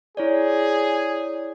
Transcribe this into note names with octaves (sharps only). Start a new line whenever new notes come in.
E4 G#4 C#5 D5